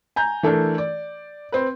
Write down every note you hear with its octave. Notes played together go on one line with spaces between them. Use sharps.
G#5 A#5 G6
E3 A3 D4 A4 A#4
D5
C4 B4